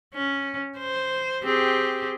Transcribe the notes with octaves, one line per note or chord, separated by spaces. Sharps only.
C#4
C5
C4 G4 G#4